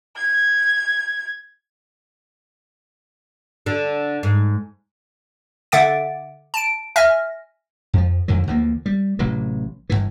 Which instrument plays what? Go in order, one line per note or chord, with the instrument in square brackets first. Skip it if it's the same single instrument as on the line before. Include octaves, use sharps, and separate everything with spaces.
[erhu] G#6
[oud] D3
G#2
[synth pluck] D3 E5 F#5 D6 A6 D7
A5 D7
E5 G#5 F6 A#6
[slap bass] F2 F3
F2 D3 D#3 F#3
D2 E3 F3 A#3
G3
A1 C3 E3 F#3
G1 C2 E3